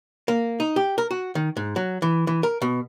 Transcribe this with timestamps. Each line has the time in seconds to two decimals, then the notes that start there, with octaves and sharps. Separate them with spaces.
0.28 A#3
0.60 D#4
0.76 G4
0.98 A#4
1.11 F#4
1.35 D#3
1.57 G#2
1.76 F#3
2.02 E3
2.27 E3
2.43 A#4
2.62 B2